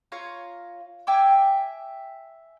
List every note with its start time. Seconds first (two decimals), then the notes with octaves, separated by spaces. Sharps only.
0.12 F4 C#5 F5 A#5
1.07 E5 G5 G#5 D6